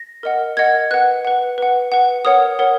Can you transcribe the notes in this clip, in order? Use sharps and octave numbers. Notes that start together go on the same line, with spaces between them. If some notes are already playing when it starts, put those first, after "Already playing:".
Already playing: A#6
A#4 D#5 F#5
A#4 D#5 F#5 G#6
B4 F#5 F#6
B4 F#5
B4 F#5
B4 F#5
A#4 C#5 F#5 D#6
A#4 C#5 F#5